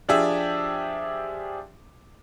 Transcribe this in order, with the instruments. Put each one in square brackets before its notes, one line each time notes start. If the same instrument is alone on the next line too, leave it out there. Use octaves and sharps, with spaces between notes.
[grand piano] F3 D4 G4 G#4 E5